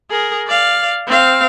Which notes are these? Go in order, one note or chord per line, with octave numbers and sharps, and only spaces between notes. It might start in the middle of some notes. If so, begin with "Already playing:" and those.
G#4 A#4
D5 F5
C4 F5